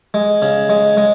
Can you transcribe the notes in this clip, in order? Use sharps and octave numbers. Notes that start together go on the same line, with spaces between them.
G#3
C#3
G#3
G#3